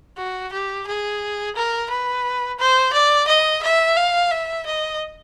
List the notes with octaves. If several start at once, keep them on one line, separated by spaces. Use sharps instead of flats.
F#4
G4
G#4
A#4
B4
C5
D5
D#5
E5
F5
E5
D#5